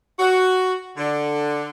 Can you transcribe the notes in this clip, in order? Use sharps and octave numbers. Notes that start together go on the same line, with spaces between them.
F#4
D3